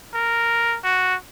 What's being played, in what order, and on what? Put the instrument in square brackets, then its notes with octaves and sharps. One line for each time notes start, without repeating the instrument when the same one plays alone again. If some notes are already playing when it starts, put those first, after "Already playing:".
[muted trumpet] A#4
F#4